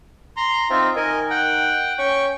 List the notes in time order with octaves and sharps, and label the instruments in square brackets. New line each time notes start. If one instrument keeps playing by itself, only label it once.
[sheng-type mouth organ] A#5 C6
[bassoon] C4 [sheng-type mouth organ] D#4 F4 E5
[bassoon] D#3 [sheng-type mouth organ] A#4 D#5 G#5
[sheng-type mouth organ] F#5 G5
[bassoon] C#4 [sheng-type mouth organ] G5 C#6